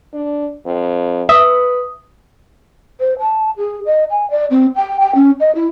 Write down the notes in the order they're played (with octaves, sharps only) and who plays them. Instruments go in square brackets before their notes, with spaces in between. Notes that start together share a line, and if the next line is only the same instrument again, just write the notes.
[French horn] D4
F2
[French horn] B4 [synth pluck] E5 [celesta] D#6
[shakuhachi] C5
A5
G#4
D#5
G#5
D5
C4
G5
G5
C#4
D#5
E4